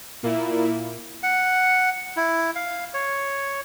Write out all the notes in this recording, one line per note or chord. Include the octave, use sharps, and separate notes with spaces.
A#2 A#3 E4
F#5
E4
F5
C#5